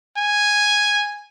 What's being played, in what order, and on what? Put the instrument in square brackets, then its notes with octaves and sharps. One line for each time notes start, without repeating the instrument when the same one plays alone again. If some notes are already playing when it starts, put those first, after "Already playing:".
[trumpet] G#5